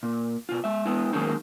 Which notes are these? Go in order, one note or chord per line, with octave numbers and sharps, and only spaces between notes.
A#2
B2 F4
G#3 E5
G#3 B3 E4
D#3 F#3 G#3 A#3 C#4 D#4